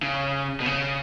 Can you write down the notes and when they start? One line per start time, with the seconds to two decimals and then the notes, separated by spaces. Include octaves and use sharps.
0.03 C#3
0.60 B2
0.66 C#3